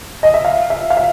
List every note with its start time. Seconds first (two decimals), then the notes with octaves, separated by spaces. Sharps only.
0.23 D#5
0.34 E5
0.45 F5
0.70 E5
0.90 F5
0.97 E5